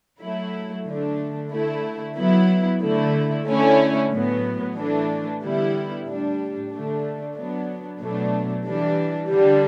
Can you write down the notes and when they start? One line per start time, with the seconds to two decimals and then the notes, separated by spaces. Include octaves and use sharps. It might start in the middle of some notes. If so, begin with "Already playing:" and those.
0.21 F#3 A3 E4
0.86 D3 A3 D4
1.52 D3 A3 E4
2.17 F#3 B3 E4
2.82 D3 A3 E4
3.47 D3 A3 C#4 E4
4.11 A2 F#3 B3
4.76 E3 A3 D4
5.41 D3 G3 B3 E4
6.06 A2 G3 D4
6.71 D3 A3 D4
7.36 F#3 B3 D4
8.01 B2 F#3 A3 D4
8.66 E3 G3 D4
9.30 D3 G3 D4